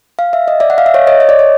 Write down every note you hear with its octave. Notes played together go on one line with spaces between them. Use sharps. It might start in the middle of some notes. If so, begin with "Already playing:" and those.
F5
E5
D#5
D5 E5
F#5
F5
E5
C#5 D#5
C#5 D#5
D#5
D5
C#5